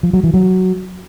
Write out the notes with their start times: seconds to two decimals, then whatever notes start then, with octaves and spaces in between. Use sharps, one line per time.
0.03 F3
0.13 F#3
0.24 E3
0.34 F#3